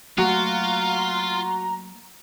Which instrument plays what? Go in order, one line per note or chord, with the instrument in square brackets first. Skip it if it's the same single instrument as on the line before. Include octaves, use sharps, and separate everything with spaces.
[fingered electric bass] F#3 A3 A#3 [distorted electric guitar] F4 [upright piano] F#4 [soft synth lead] A#5